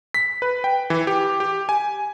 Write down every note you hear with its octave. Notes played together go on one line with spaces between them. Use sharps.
B6
B4
G5
E3
G4
G4
G#5